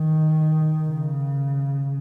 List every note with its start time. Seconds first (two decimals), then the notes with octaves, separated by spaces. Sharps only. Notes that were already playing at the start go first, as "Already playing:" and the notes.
Already playing: D#3
0.89 C#3